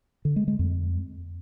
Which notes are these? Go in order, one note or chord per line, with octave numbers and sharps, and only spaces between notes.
D3
G#3
G#3
F2